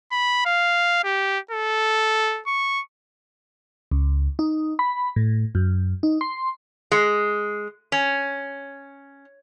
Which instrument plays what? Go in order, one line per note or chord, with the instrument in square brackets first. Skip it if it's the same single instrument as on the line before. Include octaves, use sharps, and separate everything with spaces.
[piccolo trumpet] B5
F5
G4
A4
C#6
[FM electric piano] C#2
D#4
B5
A2
F#2
D#4
C6
[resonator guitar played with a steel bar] G#3
C#4